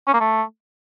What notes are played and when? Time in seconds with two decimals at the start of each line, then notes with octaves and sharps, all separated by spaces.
0.07 C#4
0.13 A#3
0.20 A3